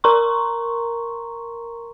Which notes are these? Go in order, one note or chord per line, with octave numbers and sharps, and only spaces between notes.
A#4 A#5 C6 C#6